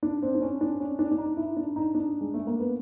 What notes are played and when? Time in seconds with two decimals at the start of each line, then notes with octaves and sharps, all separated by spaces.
0.03 D4
0.23 C4
0.35 D4
0.42 C#4
0.61 D4
0.80 C#4
0.99 D4
1.11 D4
1.18 D#4
1.37 E4
1.57 D4
1.76 D#4
1.95 D4
2.21 G#3
2.34 A3
2.47 A#3
2.59 B3